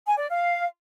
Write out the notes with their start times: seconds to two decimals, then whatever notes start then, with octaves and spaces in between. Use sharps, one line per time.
0.06 G#5
0.18 D5
0.29 F5